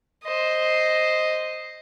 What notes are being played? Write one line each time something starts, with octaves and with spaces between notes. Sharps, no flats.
C5 D#5